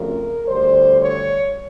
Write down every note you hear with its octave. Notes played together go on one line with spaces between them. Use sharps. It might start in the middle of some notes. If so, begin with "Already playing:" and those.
Already playing: F2 C#3 F#3 A3 A#4
D2 D3 G3 C5
C#5